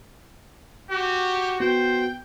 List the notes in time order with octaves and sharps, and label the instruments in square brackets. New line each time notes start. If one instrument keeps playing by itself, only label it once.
[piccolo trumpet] F#4 [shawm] G4
[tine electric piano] B3 F#4 [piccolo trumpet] C5 [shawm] G5